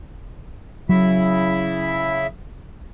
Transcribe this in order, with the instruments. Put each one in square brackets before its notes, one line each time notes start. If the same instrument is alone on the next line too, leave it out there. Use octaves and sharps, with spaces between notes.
[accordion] C#3 E4 E5 [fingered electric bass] F#3